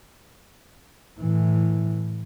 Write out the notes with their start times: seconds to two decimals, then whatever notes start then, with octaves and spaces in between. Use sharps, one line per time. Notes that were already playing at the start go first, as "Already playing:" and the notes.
1.21 A2 E3